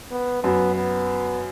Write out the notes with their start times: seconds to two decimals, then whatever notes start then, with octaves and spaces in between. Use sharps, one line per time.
0.12 B3
0.43 F#2 B3
0.75 B3